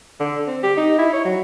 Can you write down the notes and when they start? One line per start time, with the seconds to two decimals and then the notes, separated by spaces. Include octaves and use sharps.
0.20 D3
0.47 C4
0.63 G4
0.77 D#4
0.98 E4
1.13 C#5
1.25 F#3